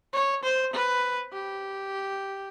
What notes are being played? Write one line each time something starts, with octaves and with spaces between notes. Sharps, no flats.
C#5
C5
B4
G4